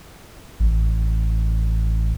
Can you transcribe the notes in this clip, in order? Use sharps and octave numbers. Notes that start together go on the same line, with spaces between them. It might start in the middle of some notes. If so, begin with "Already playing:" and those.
A1